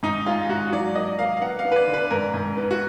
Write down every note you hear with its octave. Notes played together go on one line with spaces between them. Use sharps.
G#2 D#4
G#3 F4
G#2 F#4
F#3 D5
A#3 D#5
A#3 F5
F5
B3 F#5
F5
B3
B4
D5
D3
B4
G#2 A#4
G#2
B3
F#4